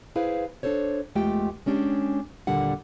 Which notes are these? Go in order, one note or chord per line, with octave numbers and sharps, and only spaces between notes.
E4 G#4 B4 C5 F5
D4 F4 A4 C5 C#5
E2 G#3 A3 F4 G4 G5
G#3 C#4 D4 G4 G#4
D#2 A#2 D3 G3 F#5